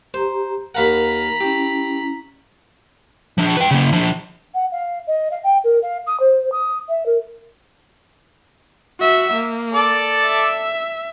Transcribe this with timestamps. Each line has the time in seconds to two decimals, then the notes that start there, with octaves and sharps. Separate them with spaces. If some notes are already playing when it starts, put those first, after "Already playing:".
0.14 G4 C5 A#5
0.75 D#2 A#4 F5 F#5 A#5 B5
1.41 C#4 E4 G4
3.38 F3 D4
3.57 B4 G5
3.71 C#3 A#3
3.92 F3 D4
4.54 F#5
4.72 F5
5.07 D#5
5.31 F5
5.44 G5
5.64 A#4
5.83 F5
6.07 D#6
6.20 C5
6.52 D#6
6.89 E5
7.06 A#4
9.00 F#4 E5
9.34 A#3
9.73 A4 D5 D6
10.27 E5